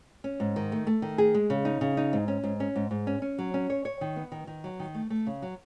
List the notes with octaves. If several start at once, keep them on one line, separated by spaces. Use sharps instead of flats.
C#4
G#2
D#3
A3
A3
D#3
G#4
G#3
C#3
D#4
C#3
D#4
G#2
C#4
G#2
C#4
G#2
G#2
C#4
C#4
F#3
C#4
C#5
C#5
D#3
B3
D#3
D#3
F#3
D#3
A3
A3
C#3
F#3